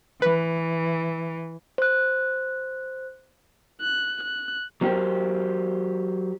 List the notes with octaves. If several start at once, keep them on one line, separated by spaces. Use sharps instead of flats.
E3 B4
C5 F#6
F#6
F#6
F#3 B3 C#4 G4 A#4 C5